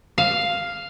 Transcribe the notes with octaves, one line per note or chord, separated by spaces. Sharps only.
F5